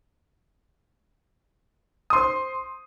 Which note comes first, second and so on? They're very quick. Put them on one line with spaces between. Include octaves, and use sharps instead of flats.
D#6 C6 C5